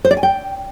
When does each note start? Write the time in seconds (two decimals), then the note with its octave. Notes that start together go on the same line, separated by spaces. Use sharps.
0.05 C5
0.11 D5
0.17 G#5
0.23 G5